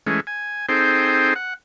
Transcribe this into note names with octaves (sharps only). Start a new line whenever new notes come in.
E3 G#3 A3 C#4
G#5
C4 D#4 G#4 A4 C5 G5
F#5